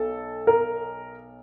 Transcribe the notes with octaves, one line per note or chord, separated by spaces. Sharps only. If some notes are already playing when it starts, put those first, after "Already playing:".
Already playing: B1 A4
A#4